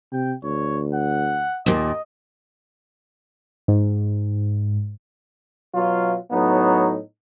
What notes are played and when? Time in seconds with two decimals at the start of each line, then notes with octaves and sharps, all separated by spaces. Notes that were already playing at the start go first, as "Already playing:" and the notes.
0.13 C3 G5
0.43 D2 C#5
0.94 F#5
1.66 D#2 A#2 D#5
3.68 G#2
5.75 B2 F#3 F4
6.31 A2 F#3 B3 D#4